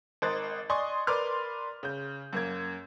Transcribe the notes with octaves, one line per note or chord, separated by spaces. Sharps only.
G#1 A#4 C5 D#5 F#6 A6
D5 D#5 G#5 C6 C#6 D#6
A#4 B4 D5 C6 D6 F6
C#3 G6
F#2 A#3 G#6